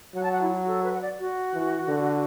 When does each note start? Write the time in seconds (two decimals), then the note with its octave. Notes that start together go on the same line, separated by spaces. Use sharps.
0.15 F#3 F#5
0.23 A5
0.32 F#5
0.42 E4
0.49 F#4
0.67 A4
0.84 B4
0.93 F#5
1.02 D5
1.19 F#4
1.54 E3
1.88 D3